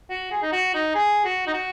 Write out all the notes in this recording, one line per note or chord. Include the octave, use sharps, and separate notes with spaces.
F#4
G#4
D#4
F#4
D#4
G#4
F#4
D#4
F#4